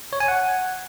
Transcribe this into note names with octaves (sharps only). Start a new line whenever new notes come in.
C#5
G#5
F#5